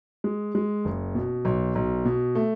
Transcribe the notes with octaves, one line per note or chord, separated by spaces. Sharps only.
G#3
G#3
F#1
B2
B1
B1
B2
A3